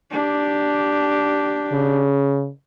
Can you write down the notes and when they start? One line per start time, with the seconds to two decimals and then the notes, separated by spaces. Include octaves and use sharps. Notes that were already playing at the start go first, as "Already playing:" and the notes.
0.12 D4 G4
1.72 C#3